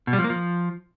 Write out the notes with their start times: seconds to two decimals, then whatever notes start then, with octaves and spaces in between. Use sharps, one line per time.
0.07 B2
0.13 G3
0.19 F3
0.24 A#3
0.30 F3